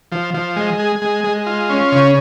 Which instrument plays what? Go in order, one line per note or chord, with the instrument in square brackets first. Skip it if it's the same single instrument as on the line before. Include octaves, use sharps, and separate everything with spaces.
[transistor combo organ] F3
F3
G#3
G#4
G#3
G#3
F4
C#4
C#3